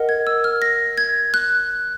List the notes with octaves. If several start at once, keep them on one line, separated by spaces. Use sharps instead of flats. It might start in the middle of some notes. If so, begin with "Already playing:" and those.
Already playing: A#4 D#5 F#5
G#6
E6
F6
A#6
G#6
F#6